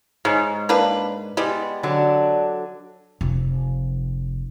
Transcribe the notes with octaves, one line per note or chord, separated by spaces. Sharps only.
G#2 G#3 C#5
A#3 D4 B4
G3 G#3 B3
D3 F#3 D4
F1